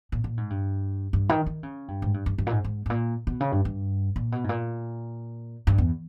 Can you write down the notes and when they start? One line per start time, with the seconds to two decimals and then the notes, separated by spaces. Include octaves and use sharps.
0.12 A#2
0.24 A#2
0.37 G#2
0.50 G2
1.13 G2
1.29 D#3
1.46 D#3
1.63 C#3
1.88 G2
2.02 G#2
2.14 G2
2.26 G2
2.38 G2
2.47 A#2
2.52 G#2
2.64 G#2
2.86 G#2
2.90 A#2
3.27 B2
3.40 C#3
3.52 G2
3.65 G2
4.16 A#2
4.32 B2
4.44 G#2
4.49 A#2
5.67 G2
5.78 E2